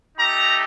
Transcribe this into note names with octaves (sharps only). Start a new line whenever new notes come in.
A3 D#4 G4 A#5